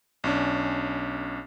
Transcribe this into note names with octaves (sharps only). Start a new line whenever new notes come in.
B1 C#4 D4